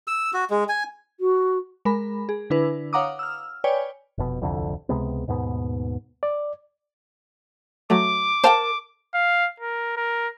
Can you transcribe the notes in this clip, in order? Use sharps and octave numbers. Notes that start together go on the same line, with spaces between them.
E6
F#4
G#3
G#5
F#4
G#3 A#4 B5
G#4
D3 D4 E4 B4
C#5 F5 F#5 A#5 D6 D#6
E6 F6
B4 C#5 D5 G5 G#5
F1 B2
D1 C2 F2 D3
C#2 C3 G#3 B3
D#2 G#2 B2 B3
D5
F#3 A3 D6
A#4 C5 F5 G5 A5
F5
A#4
A#4